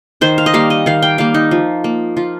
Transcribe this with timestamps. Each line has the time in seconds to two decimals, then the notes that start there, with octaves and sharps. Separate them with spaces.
0.21 D#3 C5
0.38 F5
0.46 D#5
0.53 G3 A#3 F5
0.70 D#5
0.86 D#3 F5
1.02 G5
1.18 G3 A#3 F5
1.34 D#4
1.51 F3
1.84 A#3
2.17 F3 F4